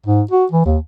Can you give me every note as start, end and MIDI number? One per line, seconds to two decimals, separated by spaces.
0.07 0.23 44
0.31 0.46 66
0.52 0.65 52
0.65 0.78 39